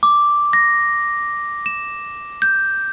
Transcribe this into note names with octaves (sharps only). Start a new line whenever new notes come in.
D6
A#6
E7
G6